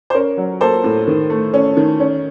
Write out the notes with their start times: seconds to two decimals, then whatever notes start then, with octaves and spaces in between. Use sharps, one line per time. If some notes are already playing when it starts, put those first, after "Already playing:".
0.10 C5
0.14 C#4 A#4
0.37 F#3
0.61 A#3 A4 C5
0.84 A2
1.07 D#3
1.30 A3
1.54 C#4
1.77 D#3
2.00 C#4